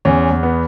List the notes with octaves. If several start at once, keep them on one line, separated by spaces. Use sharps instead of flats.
E2 C#4
E2
B3